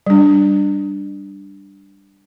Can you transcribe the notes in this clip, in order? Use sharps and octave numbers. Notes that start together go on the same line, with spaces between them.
G3 D4